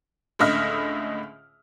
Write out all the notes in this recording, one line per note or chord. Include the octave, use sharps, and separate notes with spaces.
C#2 A2 D3 D#5 E5 F6